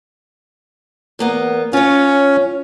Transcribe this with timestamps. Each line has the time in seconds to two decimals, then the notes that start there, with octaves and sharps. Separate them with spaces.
1.19 E2 A#3 B3
1.73 C#4 F4 C#5